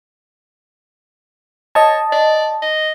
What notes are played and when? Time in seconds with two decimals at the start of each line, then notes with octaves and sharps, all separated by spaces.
1.75 C#5 D#5 A5
2.12 D5
2.62 D#5